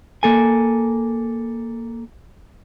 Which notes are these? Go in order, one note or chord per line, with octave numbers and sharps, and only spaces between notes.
A#3 A4 G#5